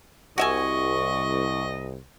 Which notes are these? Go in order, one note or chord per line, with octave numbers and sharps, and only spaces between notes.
C2 F#4 D#5 E5 G#5 C#6